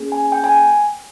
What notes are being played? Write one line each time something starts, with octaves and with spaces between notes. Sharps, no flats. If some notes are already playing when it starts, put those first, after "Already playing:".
Already playing: A#3 C#4 G#4
G#5
G5
G#5